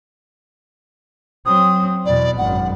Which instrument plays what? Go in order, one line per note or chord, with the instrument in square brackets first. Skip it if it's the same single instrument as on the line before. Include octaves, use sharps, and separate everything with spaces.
[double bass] F#3 C4 [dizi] D#6
[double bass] E2 B2 [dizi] D5
[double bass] G#1 F#2 [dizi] F#5